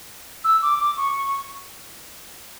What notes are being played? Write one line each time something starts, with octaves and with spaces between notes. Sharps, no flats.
E6
D6
D6
C#6